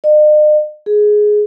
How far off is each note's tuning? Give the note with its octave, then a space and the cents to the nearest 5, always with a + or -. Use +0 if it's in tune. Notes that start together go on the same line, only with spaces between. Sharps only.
D#5 -45
G#4 +10